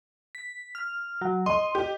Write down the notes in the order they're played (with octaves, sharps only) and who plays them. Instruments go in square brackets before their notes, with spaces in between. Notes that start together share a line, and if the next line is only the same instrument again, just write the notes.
[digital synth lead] B6
F6
F#3
[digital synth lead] D#5 [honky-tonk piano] C6
[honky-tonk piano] G4